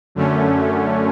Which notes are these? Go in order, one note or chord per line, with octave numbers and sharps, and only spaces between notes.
F#2 D3 A3 C#4